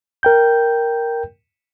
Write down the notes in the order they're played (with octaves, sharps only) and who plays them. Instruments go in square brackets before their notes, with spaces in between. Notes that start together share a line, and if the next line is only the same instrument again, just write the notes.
[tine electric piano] A#4 G5 G6